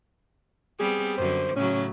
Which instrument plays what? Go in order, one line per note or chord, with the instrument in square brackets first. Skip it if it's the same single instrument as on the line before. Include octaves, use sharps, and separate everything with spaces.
[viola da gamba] G3 B3 C4 [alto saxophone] G#4
[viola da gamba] F#2 D3 [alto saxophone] C5
[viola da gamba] A2 C#3 F#3 [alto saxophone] C#4